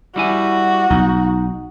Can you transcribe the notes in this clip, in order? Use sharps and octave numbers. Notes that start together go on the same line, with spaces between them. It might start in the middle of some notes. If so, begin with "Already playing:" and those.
G3 E4 F#4 G#5
B1 D#4